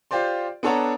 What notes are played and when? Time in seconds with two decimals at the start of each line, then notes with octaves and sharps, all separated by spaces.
0.11 F4 G4 C5 D5 C6
0.63 B3 D4 A4 C#5 F#5 A#5